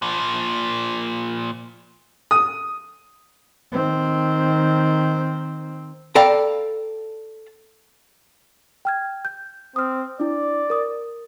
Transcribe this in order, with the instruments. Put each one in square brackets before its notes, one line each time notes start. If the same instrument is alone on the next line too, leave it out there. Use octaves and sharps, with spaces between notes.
[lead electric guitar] A#2 F3
[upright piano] D#6
[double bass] D#3 C4
[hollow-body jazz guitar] A4 D5 F5 G5 A#5 B5
[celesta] G5 F6 G#6
G6
[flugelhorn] C4 [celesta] D#6 F6
[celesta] D4 E4 [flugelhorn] D5
[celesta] A#4 D#6